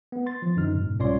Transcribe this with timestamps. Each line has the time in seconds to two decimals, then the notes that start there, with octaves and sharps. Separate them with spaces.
0.12 B3
0.26 C6 A6
0.42 F3
0.56 F#2 D3 D#4 F6
0.75 G#2 B2
0.99 C2 C#4 F4 C#5 D5 C6